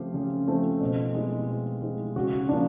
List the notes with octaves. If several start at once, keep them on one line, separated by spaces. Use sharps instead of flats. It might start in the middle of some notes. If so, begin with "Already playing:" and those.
Already playing: C#3 F3 A3 C4 F4 G4
C#3
F3 A3 C4
B2
G#3 C4 E4
B2
G#3 C4 E4
C#3 F#4
F3 A#3 D4